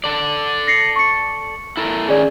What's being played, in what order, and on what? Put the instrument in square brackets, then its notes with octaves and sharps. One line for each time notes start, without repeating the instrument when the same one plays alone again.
[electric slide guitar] A4 D5
[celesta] A#6 C7 C#7
C#6 C#7
[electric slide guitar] E4 A4 A#4
[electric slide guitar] D#3 C#4 [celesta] G#4 D5